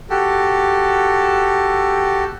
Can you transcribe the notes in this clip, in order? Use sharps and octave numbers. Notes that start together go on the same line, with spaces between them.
F#4 G4 A4